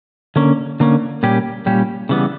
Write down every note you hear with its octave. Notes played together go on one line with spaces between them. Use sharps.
D3 A#3 C#4
D3 A#3 C#4
A#2 G3 C#4 G4
A#2 G3 C#4 G4
C#3 E3 G3 B3